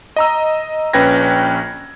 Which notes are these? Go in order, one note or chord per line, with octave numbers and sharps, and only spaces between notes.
D#5 A#5 E6
A#1 C#4 B4 G5 G#6 A#6